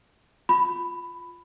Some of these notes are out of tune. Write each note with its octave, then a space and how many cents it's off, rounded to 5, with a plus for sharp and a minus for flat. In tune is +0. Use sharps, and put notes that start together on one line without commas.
F4 +0 B5 +10